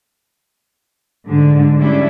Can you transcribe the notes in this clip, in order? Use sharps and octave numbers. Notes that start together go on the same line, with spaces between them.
G#2 D3 G#3
G3 C#4 D4 E4